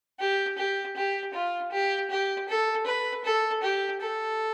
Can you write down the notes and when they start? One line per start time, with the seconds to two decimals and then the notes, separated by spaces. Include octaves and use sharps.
0.20 G4
0.58 G4
0.96 G4
1.34 F4
1.72 G4
2.10 G4
2.49 A4
2.86 B4
3.24 A4
3.62 G4
4.01 A4